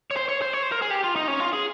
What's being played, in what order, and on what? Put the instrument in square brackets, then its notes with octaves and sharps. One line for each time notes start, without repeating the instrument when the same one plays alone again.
[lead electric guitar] C#5
C5
C#5
C5
C#5
C5
A#4
G#4
G4
F4
D#4
C#4
F4
G#4